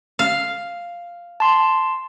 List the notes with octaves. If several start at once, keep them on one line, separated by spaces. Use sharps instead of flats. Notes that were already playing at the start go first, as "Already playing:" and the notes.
F5
A5 C6